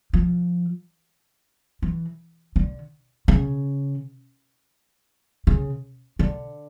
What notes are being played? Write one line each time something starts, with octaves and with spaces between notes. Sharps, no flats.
F3
E3
D3
C#3
C#3
D3